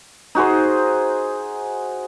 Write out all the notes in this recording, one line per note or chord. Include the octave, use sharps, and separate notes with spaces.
D#4 F#4 G#4 C5